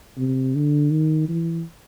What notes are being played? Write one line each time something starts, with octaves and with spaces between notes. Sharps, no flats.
C3
D3
D#3
E3